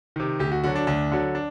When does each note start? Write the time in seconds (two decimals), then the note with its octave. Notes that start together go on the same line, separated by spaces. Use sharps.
0.16 C3 D#3
0.39 D2 G4
0.52 F#4
0.63 D3 F#3 F#4
0.75 D4
0.87 D2 D4
1.11 D3 F#3
1.35 D4